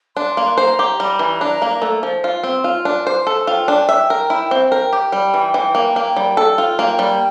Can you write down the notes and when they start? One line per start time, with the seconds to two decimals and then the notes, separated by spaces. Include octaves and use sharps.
0.16 D4 C6
0.37 A#3
0.57 C5 A#5
0.79 G4
1.00 G3 A#5
1.19 E3
1.41 D4
1.62 A#3
1.82 A3
2.03 F3
2.24 F4
2.43 C4
2.64 F4
2.85 D4
3.07 C5
3.27 A4
3.47 F4 G5
3.68 D4
3.89 E5
4.10 A#4
4.30 E4
4.51 C4
4.72 A#4
4.93 G4
5.12 G3
5.34 E3
5.54 E3
5.75 A#3
5.96 A#3
6.16 G3
6.37 A4
6.58 F4
6.79 A#3 G5
6.99 G3